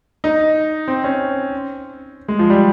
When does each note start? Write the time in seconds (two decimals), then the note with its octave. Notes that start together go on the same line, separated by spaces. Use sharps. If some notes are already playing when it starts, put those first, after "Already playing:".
0.24 D#4
0.88 C4
1.04 C#4
2.28 G#3
2.39 F3
2.50 G3